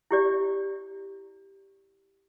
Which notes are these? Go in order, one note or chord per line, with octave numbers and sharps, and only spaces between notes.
E4 G4 D5